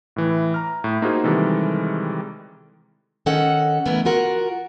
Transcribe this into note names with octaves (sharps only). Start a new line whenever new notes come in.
A2 E3
A#5 F6
A2
A#3 D#4 F4 F#4 G#4 C5
C3 D#3 E3 G3 G#3 A4
D#3 C#4 A4 D#5 F#5
E3 A3 B3 A#4
F4 F#4 A#4 F#5